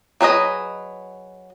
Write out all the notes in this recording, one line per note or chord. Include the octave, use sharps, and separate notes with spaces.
F#3 G#4 B4 D#5